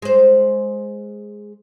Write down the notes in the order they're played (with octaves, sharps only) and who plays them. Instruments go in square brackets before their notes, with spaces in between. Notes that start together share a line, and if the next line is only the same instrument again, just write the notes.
[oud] G#3 C5